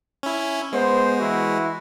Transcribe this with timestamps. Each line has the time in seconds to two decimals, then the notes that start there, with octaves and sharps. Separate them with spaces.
0.23 C#4 E4
0.72 G#3 B3 C5
1.19 E3 E4 F#4